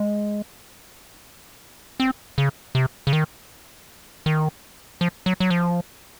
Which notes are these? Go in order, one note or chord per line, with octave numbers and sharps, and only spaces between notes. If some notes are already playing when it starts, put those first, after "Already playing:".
Already playing: G#3
C4
C#3
C3
C#3
D#3
D#3
F3
F#3
F#3
F3